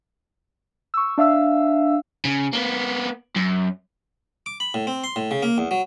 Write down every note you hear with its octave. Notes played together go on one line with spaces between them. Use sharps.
C#6 E6
D4 E5 F5 E6
C#3
A#3 B3
F#2
D6
B5
A2
C4
C6
A2
C#3
A#3
E2
F#3